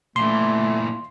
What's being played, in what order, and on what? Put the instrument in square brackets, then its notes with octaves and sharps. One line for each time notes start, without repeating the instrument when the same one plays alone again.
[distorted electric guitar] A#2 E3 [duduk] A3 [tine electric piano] C6